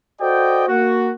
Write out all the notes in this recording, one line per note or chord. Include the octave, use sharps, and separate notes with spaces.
F#4 A4 C5 D5 D#5 G5
A#3 F#4